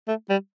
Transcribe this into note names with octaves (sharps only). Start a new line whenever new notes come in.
A3
G3